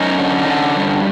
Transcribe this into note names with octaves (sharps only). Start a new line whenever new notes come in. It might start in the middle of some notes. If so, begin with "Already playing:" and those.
Already playing: F#2 C#4 D#4
D3
D3
G2